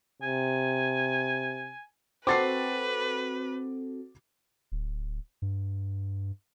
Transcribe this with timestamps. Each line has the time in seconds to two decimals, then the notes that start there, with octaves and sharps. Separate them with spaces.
0.22 C3 G#5
2.27 C4 F#4 A4 B4 D6 A6 C7
4.72 D1
5.42 G2